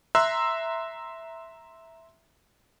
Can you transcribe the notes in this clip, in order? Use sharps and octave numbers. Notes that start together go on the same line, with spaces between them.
E5 A#5 C6 E6 F#6